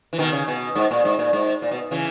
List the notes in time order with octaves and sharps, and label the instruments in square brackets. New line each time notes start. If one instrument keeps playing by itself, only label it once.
[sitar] E3
B2 D#3
C#3
B2
G#2
A#2
G#2
A#2
G#2
A#2
B2
C#3 E3